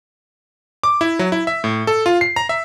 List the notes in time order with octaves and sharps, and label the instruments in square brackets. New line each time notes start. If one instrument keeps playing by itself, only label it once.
[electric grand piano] D6
E4
F#3
E4
E5
A2
A4
F4
C7
A#5
E5